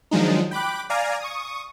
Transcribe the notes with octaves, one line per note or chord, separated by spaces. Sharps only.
D#3 F3 F#3 G#3 D4 D#4
G5 B5 D6 F#6
D5 F5 G#5 A#5
C#6 D#6